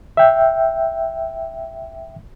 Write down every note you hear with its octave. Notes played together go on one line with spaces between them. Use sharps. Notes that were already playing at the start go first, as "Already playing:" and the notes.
E5 G5